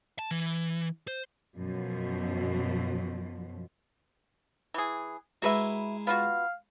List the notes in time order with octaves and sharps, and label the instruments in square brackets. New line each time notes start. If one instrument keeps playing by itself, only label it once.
[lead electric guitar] A5
E3
C5
[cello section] F#2 B2 F3
[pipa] E3 G#4
[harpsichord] G#3 E4 A#4 [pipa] F#4 B4 E5
[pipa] B3 F4 F#4 [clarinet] F5